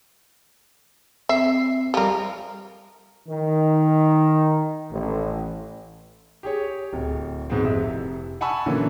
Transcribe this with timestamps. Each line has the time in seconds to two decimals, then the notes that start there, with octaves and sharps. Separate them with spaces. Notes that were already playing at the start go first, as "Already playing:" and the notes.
1.29 C4 E5 C7
1.94 F3 G3 G4 A#4
3.28 D#3
4.92 A1
6.43 G4 G#4 C#5
6.93 D1
7.50 G#2 B2 G#3 B3 C4
7.64 F1 C3 E4 E5
8.41 F#5 G#5 A5 B5 C#6 E6
8.66 A#2 D3 E3 F#3 A#3 C#4